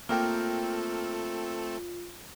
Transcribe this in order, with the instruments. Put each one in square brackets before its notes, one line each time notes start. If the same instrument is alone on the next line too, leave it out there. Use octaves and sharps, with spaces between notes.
[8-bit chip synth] A3 C4 A4 [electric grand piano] A#3 A#4 G5 [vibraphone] F4